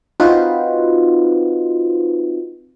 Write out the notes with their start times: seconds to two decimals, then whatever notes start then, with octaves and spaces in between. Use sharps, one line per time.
0.20 C4 D#4 F4 F#4 B4 C5